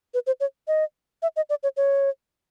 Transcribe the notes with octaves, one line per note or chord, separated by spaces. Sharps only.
B4
C5
C#5
D#5
E5
D#5
D5
C#5
C#5